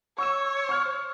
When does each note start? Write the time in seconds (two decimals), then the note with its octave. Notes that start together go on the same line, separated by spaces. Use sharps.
0.18 C#5 C#6 E6 E7
0.69 C#6 F6